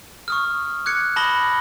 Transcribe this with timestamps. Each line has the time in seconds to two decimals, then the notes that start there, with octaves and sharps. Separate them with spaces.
0.28 C#6 D#6 F6
0.86 D6 F#6 G#6 C#7
1.16 A5 B5 D#6 A#6 F#7 G7